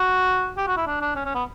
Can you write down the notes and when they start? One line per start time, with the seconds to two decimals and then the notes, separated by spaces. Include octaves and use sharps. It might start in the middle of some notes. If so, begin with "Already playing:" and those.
Already playing: F#4
0.58 G4
0.67 F#4
0.77 E4
0.87 D4
1.01 D4
1.16 C#4
1.26 C#4
1.35 B3